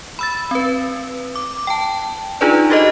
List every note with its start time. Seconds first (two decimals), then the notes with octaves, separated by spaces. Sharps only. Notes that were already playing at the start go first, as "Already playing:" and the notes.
0.19 B5 E6 A6
0.51 C4 B4
1.36 D6
1.67 G5 A5
2.41 D4 D#4 F4 G#4 B4 D5
2.70 F#4 G4 A4 C5 D#5